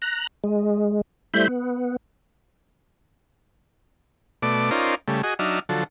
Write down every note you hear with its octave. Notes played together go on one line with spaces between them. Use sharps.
A#5 F#6
G#3
G3 A3 E4 C5 B5 G6
B3
B2 A3 D5 D6
C#4 D#4 F4 A#4 C5 D5
C#3 G3 A3
F#4 G#4 D#5
F#3 D4 D#4 E5 F6
D3 F3 F#3 A4